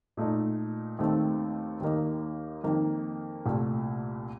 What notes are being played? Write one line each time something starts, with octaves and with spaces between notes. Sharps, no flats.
A#2 A3 D#4
D#2 D#3 A3 C4
D#2 D#3 A#3 D#4
F2 D#3 A#3
C2 A#2 A3